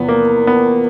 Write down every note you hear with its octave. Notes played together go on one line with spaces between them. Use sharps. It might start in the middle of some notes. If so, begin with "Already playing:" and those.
Already playing: E2 C3 F3 B3
A#3
B3